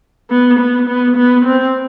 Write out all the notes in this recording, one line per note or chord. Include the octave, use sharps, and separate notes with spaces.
B3
B3
B3
B3
C4